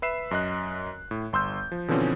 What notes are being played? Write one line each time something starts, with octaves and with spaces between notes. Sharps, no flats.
B4 E5 C7 E7
F#2 D#5 F#6
A2
G1 C6 E6 G6
F3
B2 D3 E3 F3 C4 C#4